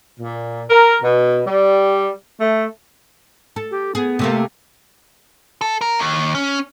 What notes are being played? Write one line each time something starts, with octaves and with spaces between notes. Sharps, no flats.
A#2
A#4
B2
G3
A3
A4
G4
B3 G#4
C3 A3 A#3
A4
A#4
D#2
C#4